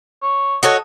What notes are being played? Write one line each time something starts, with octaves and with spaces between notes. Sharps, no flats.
C#5
F#4 A4 C#5 D#5